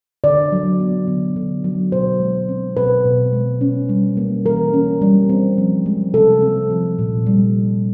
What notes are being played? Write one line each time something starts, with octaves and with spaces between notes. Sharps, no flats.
D3 D5
F#3
B3
D3
D3
F#3
B2 C5
G#3
C4
B2 B4
B2
G#3
C#4
G3
A#3
E3 A#4
C#4
G3
C4
F3
G#3
C3 A4
C4
F3
A#2
G3
C4